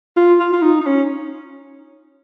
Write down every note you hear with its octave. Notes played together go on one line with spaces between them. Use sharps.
F4
F4
F4
D#4
D#4
C#4